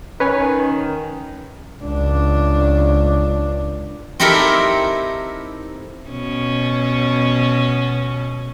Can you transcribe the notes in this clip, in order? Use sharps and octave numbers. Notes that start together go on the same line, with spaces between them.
D#3 C#4 B4 C#5 G#5
C#2 D4
C4 D#4 E4 G4 A4 A#4
B2 C#4